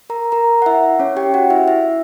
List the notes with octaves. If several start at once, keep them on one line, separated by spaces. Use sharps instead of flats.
A#4 A#5
A#4 A#5
F#5
E4 E5
C#4 C#5
G4 G5
F#4 F#5
E4 E5
E4 E5